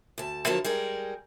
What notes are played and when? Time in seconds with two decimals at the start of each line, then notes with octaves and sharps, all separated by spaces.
0.18 D2 A5
0.46 D3 F3 F#3 A#4 A5
0.64 G3 G#3 G#4 A#4